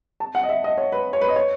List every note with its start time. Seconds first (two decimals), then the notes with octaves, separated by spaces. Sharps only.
0.20 A5
0.35 F#5
0.43 D#5
0.49 E5
0.64 D#5
0.78 C#5
0.92 B4
1.13 C#5
1.21 B4
1.28 D#5
1.36 C#5